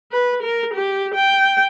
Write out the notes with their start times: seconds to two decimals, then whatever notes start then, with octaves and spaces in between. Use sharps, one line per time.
0.12 B4
0.42 A#4
0.74 G4
1.14 G5